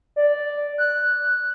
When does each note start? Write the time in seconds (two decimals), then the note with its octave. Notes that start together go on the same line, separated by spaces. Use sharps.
0.16 D5
0.78 F#6